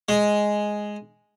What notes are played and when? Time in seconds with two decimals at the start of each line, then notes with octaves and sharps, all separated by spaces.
0.09 G#3